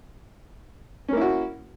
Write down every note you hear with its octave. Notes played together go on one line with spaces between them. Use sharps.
A#3 C#4 E4 F#4